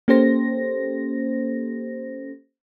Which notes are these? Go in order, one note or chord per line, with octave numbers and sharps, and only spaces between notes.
A#3 C#4 G4 A4 C5 A#6